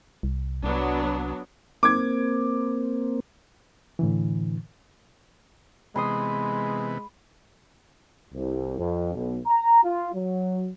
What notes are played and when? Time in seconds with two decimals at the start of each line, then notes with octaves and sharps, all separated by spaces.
0.23 C2
0.64 C2 F#3 B3 D4
1.83 A#3 C4 D6 G#6
3.99 A2 D3 E3
5.96 C3 E3 G#3 B3 B5 C6 D#6
8.34 C2
8.79 F2
9.15 B1
9.47 A#5
9.84 F4
10.14 F#3